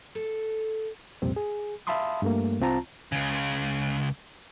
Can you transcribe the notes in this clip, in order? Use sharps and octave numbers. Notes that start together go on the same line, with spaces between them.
A4
C2 F2 A#2 G3 C4
G#4
E5 F5 A5 B5 C6 D#6
G2 A3 A#3
C2 C4 F4 A5 A#5
C#2 C#3